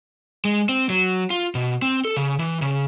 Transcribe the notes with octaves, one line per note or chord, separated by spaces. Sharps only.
G#3
C4
F#3
F4
B2
C4
A4
C#3
E3
C#3